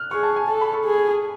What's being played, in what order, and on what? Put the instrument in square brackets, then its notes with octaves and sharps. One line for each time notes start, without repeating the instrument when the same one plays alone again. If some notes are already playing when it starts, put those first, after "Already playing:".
Already playing: [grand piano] F6 F#6
[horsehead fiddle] G#4 [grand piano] C#6
[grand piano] A5
G#5
[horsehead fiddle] A4 [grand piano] A5
[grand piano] B5
C#6
[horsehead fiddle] G#4